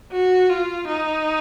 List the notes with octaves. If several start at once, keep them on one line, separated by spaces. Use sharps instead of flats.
F#4
F4
D#4